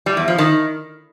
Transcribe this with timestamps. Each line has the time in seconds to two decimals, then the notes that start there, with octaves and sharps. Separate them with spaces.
0.06 G3
0.17 E2
0.28 F3
0.38 D#3